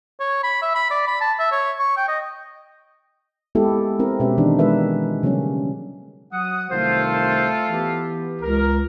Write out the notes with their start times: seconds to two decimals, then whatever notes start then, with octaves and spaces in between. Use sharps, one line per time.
0.20 C#5
0.43 B5
0.62 E5
0.75 B5
0.90 D5
1.07 B5
1.21 A5
1.39 E5
1.51 C#5
1.79 C#6
1.97 G5
2.08 D#5
3.55 G#3 A#3 B3 E4 G4 A4
3.99 C4 E4 A#4
4.20 B2 G#3 C#4 G4 B4 E5
4.38 D#3 E3 D4 D#4
4.59 G#3 F4 A#4 B4 E5
5.23 C#3 F#3 G3 A#3 C#4
6.33 F#3 F#5 D#6
6.70 C2 D#3 A3 F4 A4 C5
7.13 C5
7.69 E3 B3 G4
8.41 C#2 A#4